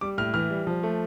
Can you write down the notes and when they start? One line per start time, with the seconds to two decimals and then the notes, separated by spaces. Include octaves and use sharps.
0.01 G3 D6
0.18 A2 F6
0.34 E3 F6
0.50 G3
0.67 F3
0.83 A3